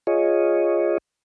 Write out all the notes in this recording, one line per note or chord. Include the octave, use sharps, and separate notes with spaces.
F4 G#4 C#5 D#5